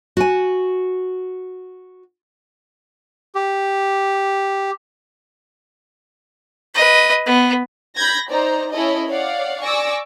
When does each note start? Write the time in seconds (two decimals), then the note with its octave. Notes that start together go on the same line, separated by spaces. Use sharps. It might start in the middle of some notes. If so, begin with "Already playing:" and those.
0.17 F#4 G#5
3.35 G4
6.75 B4 D#5
7.26 B3
7.96 B5 G6 G#6 A#6
8.29 D#4 C5 D5 A#5
8.73 C#4 E4 A4 C#5 D#5
9.09 C#5 D5 F5 F#5
9.61 D5 G#5 C#6 D6 E6 A#6